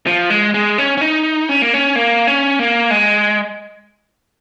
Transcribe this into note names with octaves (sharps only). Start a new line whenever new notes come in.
F3
G#3
G#3
C#4
C#4
D#4
C#4
A#3
C#4
A#3
C#4
A#3
G#3